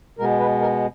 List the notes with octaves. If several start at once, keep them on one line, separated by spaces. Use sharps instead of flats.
B2 G#3 B3 A#4
B4
A#4